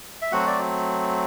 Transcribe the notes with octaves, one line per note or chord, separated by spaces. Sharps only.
E5
F#3 A3 C4 F#4 F#5
D5